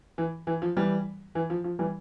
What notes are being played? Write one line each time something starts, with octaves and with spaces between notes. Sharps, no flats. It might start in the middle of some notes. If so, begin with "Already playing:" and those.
E3
E3
F3
E3 G3
E3
F3
F3
E3 G3